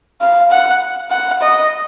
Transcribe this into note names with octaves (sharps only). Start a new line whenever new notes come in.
F5
F#5
F#5
D#5